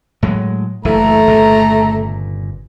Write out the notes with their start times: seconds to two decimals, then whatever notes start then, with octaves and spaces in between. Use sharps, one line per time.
0.23 A2 F#3 G#3
0.85 F#1 D2 E3 A3 A#5
1.27 G1 A#2 C#3